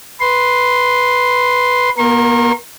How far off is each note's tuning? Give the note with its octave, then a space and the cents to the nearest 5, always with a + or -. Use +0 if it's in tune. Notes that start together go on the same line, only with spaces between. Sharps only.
B4 +0 C6 +0
B3 -45 A#4 +0 C6 +45